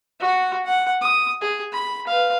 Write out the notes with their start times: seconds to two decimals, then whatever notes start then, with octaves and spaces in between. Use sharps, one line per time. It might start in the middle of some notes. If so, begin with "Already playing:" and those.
0.20 F#4 F#5
0.65 F#5
1.01 D#6
1.41 G#4
1.72 B5
2.07 B4 F5